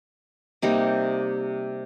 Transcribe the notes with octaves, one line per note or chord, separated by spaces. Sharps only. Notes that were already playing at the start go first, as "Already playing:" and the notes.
C3 G3 A#3 D#4